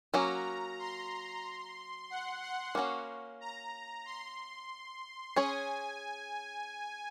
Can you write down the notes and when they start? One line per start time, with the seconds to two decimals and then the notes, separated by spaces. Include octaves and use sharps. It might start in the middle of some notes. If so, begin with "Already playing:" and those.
0.14 F#3 A#3 C#4 F#4 A#5
0.79 C6
2.10 F#5
2.43 F#5
2.75 A#3 C#4 F#4
3.41 A#5
4.05 C6
5.36 C#4 G#4 C#5 G#5